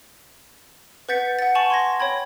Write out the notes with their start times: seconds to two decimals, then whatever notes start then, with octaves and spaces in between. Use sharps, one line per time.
1.09 B4 F#5 G6 A6 B6 C#7
1.39 F#5 A6
1.55 G#5 A5 C#6 F#7
1.70 C6 G#6 A#6
2.00 C#5 G5 B5 G#6